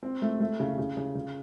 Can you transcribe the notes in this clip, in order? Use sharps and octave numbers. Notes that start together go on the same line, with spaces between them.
C4
A3
A3
C#3
C#3
C#3
C#3